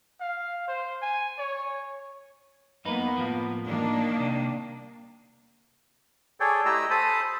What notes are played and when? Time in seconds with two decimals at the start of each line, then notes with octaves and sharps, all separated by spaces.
0.21 F5
0.68 C5
1.02 G#5
1.39 C#5
2.85 F#2 A#3 B3 D#4 B4
3.17 A2 F3
3.67 D#3 A#3 D4
4.17 C2 C3
6.40 G#4 A4 C#5 D5 G5
6.65 A3 E4 G4 D#5 A#5 E6
6.90 A4 C5 A5 B5 D#6